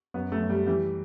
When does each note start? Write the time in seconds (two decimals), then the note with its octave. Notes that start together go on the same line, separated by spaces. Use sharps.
0.14 F#2 B3
0.32 A3
0.40 F#2
0.49 G3
0.67 E3 G3